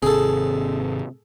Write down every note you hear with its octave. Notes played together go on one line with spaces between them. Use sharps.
G#1 C3 G#4 A4